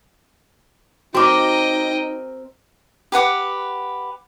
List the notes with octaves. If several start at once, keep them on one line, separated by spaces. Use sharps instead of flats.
C4 D#4 F#4 A#4 D#5 G5 D6
G4 B4 F#5 D6